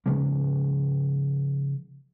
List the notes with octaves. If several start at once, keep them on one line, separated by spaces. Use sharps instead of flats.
C#3 F3 G#3 A#3